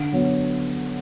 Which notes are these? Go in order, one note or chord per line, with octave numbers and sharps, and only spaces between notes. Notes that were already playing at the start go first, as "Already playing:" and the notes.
Already playing: D3
F#3 B3